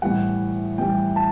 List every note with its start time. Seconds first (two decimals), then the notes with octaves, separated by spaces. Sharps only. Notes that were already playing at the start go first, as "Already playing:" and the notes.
0.02 A2 E3 G3 F#5
0.78 A2 E3 G3 G5
1.16 A5